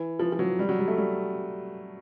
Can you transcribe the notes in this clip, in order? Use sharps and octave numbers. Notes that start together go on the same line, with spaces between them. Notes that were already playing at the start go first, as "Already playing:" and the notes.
Already playing: E3
F3
F3
F#3
G3
F#3
G3
A3
G3